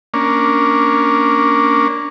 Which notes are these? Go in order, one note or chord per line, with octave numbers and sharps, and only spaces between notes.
A#3 C#4 D4